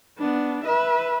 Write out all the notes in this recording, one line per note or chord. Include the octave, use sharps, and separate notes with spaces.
B3 D4
B4 E5